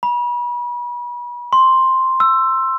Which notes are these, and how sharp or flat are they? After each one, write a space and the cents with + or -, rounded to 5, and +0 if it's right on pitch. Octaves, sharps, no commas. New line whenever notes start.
B5 -35
C6 +5
E6 +15